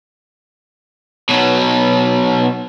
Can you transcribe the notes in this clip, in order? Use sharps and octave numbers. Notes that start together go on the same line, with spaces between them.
B2 F#3